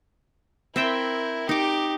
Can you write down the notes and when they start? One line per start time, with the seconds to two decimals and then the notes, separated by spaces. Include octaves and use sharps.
0.76 C4 E4 A#4 E5 G5
1.49 D#4 G4 D6